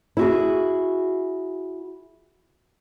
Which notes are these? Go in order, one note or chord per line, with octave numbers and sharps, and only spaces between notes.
E4 F#4 G#4